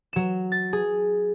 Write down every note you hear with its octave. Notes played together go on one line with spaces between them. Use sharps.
F#3 E7
A6
G#4